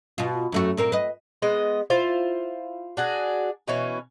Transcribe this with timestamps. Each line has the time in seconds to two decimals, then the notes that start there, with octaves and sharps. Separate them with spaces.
0.18 B2 F4
0.52 F#2 A3 F#4
0.77 A#2 C4 A#4
0.92 B4 D#5
1.42 G#3 B3 D#5
1.90 E4 F4 C5
2.97 D4 F#4 G#4
3.68 B2 E3 C#4